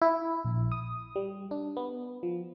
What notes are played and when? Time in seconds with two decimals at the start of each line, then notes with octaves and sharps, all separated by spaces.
0.02 E4
0.45 A#1
0.72 D#6
1.16 G3
1.51 D4
1.77 B3
2.23 F3